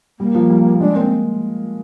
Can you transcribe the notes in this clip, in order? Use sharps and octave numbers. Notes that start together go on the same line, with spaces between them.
G3 A#3
F3
G3
G#3 D4
A#3 C4